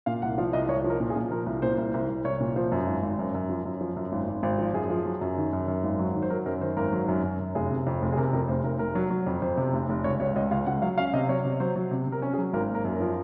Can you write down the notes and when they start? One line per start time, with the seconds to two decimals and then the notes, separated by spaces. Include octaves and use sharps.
0.06 A#2 F5
0.22 C2 F#5
0.38 F3 F5
0.53 C2 D#5
0.69 C2 C#5
0.84 F3
0.90 A#4
1.00 A#2
1.10 G#4
1.16 A#2
1.31 F3 A#4
1.46 C2
1.62 A#2 C5
1.78 C2
1.93 C2 C5
2.09 C2
2.25 C2 C#5
2.40 A#2
2.56 F3 C5
2.72 F#2
2.87 G#1
3.03 G#1
3.19 F#2
3.34 F#2
3.49 F3
3.65 F#2
3.81 F3
3.96 F#2
4.12 G#1
4.28 G#1
4.43 G#1 C5
4.58 F3
4.74 F#2 G#4
4.90 F3
5.06 F#3
5.21 F#2
5.37 D#3
5.53 F#2
5.68 F#2
5.84 G#1
5.99 F#3
6.14 D#3
6.23 C5
6.30 F#3 A#4
6.46 F#2 A#4
6.61 D#3 C5
6.77 G#1 A#4
6.92 F#3
7.08 F#2
7.24 F#2
7.40 F#2
7.55 F1 G#4
7.71 C3
7.87 F2
8.02 F1
8.12 G#4
8.17 C3 A#4
8.33 F2 A#4
8.48 F1 C5
8.64 F1 A#4
8.79 F1 A#4
8.95 F#3
9.10 F#3
9.27 F2
9.42 F2 C5
9.57 C3
9.73 F1
9.89 F1
10.04 C#2 C#5
10.20 C#2 C#5
10.36 C#2 D#5
10.51 C#2 F5
10.67 C#2 F#5
10.82 F#3 F5
10.98 C#4 F5
11.13 C3 D#5
11.29 F#3 C#5
11.45 C3
11.60 F#3 C5
11.76 F#3
11.91 C3
12.07 C3
12.12 A#4
12.22 C#4
12.33 G#4
12.38 F#3
12.53 G#1 A#4
12.69 A#3
12.75 A#4
12.85 F#2
12.96 F3 A#4